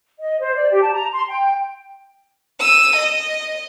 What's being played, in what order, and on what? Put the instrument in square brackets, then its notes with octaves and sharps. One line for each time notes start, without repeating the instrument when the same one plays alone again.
[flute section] D#5
C5
D5
G4
A5
A#5
C6
G5
[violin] E6 D#7
D#5